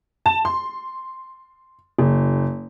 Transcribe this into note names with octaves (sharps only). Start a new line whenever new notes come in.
A5
C6
F#1